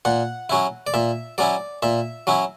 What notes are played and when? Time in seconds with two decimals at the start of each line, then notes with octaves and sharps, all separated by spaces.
0.05 A#2 F#5
0.50 F#3 C#4 E4
0.87 D5
0.94 A#2 E5
1.38 F#3 C#4 E4 D5
1.82 A#2 E5
2.27 F#3 C#4 E4